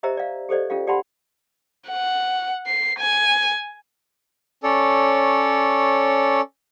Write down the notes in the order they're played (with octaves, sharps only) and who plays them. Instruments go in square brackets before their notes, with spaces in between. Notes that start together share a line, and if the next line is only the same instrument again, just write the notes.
[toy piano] G4 C5 D#5 E5 A#5 E6
D5 F5
G4 A4 C5 D5 D#5
C#4 F4 G4 F5
G4 D5 F#5 A5 B5 C6
[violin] F#5
C7
G#5
[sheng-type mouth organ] C#4 A4 C#5 D5